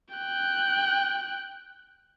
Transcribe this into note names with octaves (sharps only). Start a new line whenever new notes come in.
G5 F#6